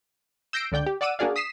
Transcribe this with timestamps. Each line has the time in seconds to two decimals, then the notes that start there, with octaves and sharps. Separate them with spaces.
0.53 E6 G6 A#6 C7 D7
0.72 C#2 D3 D5 G5 G6
0.86 G4
1.01 D5 F#5 D6 E6 D#7
1.19 A#3 D4 F#4 G#4 D5 F5
1.36 D#6 B6 C7 E7